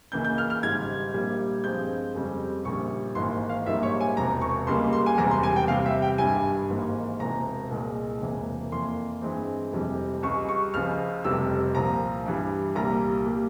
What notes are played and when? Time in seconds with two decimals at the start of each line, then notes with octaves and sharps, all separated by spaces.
0.12 C#2 C#3 E3 A#3 G6
0.25 G6
0.38 F6
0.50 F6
0.63 G#1 G#2 G3 G#6
1.14 A#1 A#2 G3 A#3
1.64 G2 F3 G#3 C4 G6
2.15 F2 C#3 G3 C4
2.65 A#1 A#2 G3 C#6
3.15 G#1 G#2 E3 A#3 C6
3.49 F5
3.66 A#1 G#2 G3 A#3 E5
3.83 C#5
4.01 G#5
4.17 E1 E2 C3 A#5
4.41 C#6
4.67 C#2 C#3 G3 A#3 C6
4.93 C6
5.06 G#5
5.17 E1 E2 C3 E3 G3 A#5
5.31 C6
5.43 G#5
5.56 G5
5.68 E2 C3 G3 F5
5.86 E5
6.02 G5
6.18 G#1 G2 G3 G#5
6.69 G#1 G#2 E3 A#3
7.20 E1 E2 C3 A#5
7.70 C2 A#2 G#3
8.21 E1 E2 C3 E3 A#3
8.71 F2 E3 A#3 C6
9.22 G2 E3 G#3 C4
9.72 F1 F2 C3 E3 G3
10.23 C#2 C#3 G3 C#6
10.49 C#6
10.74 C#2 C#3 F3 F6
11.24 F1 F2 C3 G3 E6
11.75 C2 A#2 F3 A#5
12.26 G2 E3 G3
12.76 C2 A#2 G3 A#3 A#5
13.26 G3 A#3